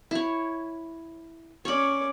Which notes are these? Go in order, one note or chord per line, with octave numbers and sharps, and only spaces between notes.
E4 C#5
C#4 C#5 D5 B5